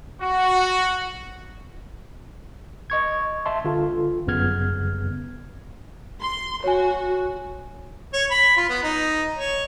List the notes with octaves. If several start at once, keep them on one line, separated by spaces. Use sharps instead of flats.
F#4
D#5 C#6 G#6
E5 A5 C6
D3 F4 A4
G1 F#2 C#3 B3 F6 G#6
C6
F#4 C#5 G#5
C#5
B5
F4
B3
D#4
C#5